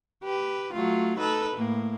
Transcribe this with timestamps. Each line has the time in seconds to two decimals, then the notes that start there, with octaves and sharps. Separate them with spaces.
0.23 G4 B4
0.73 F#3 A3 F4
1.18 D#4 A4 B4
1.57 A2 A#3